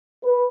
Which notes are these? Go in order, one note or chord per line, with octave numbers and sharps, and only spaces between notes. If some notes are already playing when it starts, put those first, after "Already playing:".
B4